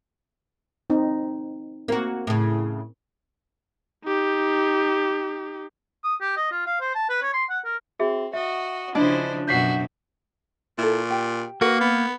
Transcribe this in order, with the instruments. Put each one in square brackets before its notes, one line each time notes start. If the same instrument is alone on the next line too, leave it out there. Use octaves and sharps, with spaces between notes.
[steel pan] C4 D#4
[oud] A#3 F#4 [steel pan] C4 A#4
[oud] A2 C#3
[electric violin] D#4 G4
[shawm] D#6
G4
D#5
F4
F5
C5
A5
B4
C#5
C6
F#5
A#4
[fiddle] C4 [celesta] F#4 G#4 E5
[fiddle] F#4 D#5 [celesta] E5
[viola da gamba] C#3 F3 [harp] D4 [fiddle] E4 C5 [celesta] D#5
[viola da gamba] F#2 B2 [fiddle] F#4 E5 [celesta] G6 B6 C7
[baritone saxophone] A#2 [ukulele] E4 A4
[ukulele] G4 G5
[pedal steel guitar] A#3 [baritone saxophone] F#4 [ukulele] A#4 B4
[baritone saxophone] B3